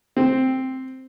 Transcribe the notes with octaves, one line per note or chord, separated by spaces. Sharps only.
C4